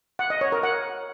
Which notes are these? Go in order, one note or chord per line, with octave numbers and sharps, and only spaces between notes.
F#5
D#5
C#5
A#4
F#5